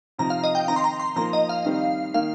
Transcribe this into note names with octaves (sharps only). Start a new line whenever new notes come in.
C3 F3 D#4 A#5
F5
D#5
G5
D#3 C4 D#4 A#5
C6
A#5
C6
F3 A#3 D#4 A#5
D#5
F5
D#3 G3 C4 D#4
D#3 A#3 D#4 F5